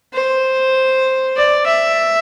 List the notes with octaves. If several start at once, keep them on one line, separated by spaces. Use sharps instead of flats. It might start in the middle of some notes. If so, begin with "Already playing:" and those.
C5
D5
E5